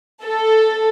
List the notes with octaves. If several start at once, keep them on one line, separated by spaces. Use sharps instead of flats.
A4